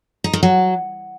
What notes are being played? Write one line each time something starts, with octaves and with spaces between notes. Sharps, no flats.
D#4
D#3
F#3